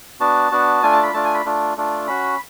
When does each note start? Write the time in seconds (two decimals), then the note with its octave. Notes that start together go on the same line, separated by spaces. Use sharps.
0.20 B3 D4 F#4 A5
0.51 B3 D4 F#4
0.83 A3 D4 F4 G#5
0.92 A5
1.03 B5
1.13 A3 D4 F4 A5
1.25 G#5
1.34 B5
1.45 A3 D4 F4
1.77 A3 D4 F4
2.07 C#4 F#4 B5